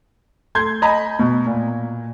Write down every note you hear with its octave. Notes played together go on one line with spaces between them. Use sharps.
A3 C6 G6 G#6
D#5 G#5 A#5 B5
B2
A#2